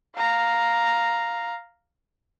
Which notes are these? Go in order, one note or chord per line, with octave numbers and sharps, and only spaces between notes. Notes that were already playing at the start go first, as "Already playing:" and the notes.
F5 A#5